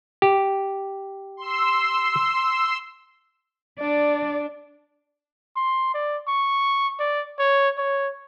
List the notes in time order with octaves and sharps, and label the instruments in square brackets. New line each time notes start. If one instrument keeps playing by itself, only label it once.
[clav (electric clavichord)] G4
[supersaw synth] C6 E6
[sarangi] D4 [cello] D5
[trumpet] C6
D5
C#6
D5
C#5
C#5